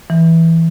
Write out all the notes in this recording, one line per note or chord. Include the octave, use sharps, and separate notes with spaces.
E3